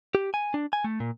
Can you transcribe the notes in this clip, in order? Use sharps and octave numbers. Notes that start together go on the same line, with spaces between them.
G4
G#5
D4
G#5
A3
A#2